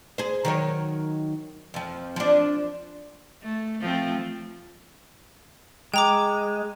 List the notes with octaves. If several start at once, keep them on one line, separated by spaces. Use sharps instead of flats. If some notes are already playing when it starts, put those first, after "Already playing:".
G#4 C5
D#3 F#3 C#5
F2 F3
F3 D4
A3
F3 A3 C4
G#3 G5 A#5 D6